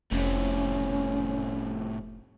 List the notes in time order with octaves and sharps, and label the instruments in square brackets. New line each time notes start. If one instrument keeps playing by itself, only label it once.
[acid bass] F1 [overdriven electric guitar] A2 C3 [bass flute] C#4